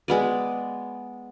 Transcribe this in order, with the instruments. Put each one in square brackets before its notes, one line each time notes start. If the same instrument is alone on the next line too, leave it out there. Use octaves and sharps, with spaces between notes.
[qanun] G#3 B3 D5